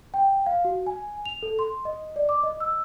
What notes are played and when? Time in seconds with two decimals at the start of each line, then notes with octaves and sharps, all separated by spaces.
0.14 G5
0.46 F5
0.65 F#4
0.86 G#5
1.26 F7
1.43 A4
1.59 C6
1.85 D#5
2.16 D5
2.29 D6
2.43 D#5
2.60 E6